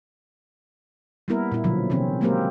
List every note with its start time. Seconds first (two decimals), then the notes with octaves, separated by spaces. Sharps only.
1.28 G3 A#3 B3 E4 A#4
1.52 A#2 E4
1.64 B2 D3 F3 F#3
1.90 C3 D#3 F3 C4 C#4
2.21 F#3 G#3 A#3 C4 G4 A#4